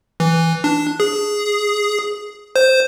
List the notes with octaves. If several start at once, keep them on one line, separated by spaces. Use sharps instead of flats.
E3
D4
G#4
C5